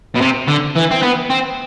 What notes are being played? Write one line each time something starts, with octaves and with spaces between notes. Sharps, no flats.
B2
C3
D3
E3
C4
B3
C4